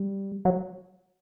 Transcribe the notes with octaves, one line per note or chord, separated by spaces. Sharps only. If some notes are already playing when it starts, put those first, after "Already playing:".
Already playing: G3
F#3